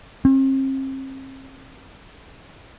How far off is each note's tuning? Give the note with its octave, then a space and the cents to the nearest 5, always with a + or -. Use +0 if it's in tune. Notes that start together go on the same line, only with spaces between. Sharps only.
C4 +40